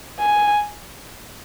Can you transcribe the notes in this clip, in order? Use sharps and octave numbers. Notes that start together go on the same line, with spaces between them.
G#5